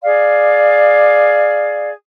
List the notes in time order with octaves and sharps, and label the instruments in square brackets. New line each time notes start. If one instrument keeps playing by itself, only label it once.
[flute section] G#4 D5 F5